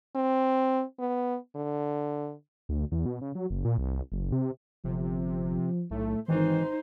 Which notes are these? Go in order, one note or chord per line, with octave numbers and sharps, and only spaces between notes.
C4
B3
D3
D2
E2
B2
C#3
F#3
F#1
A#2
C2
F#1
C3
G1 C3 F3
B1 A2 A3
G#1 D#3 E3 D#4 C5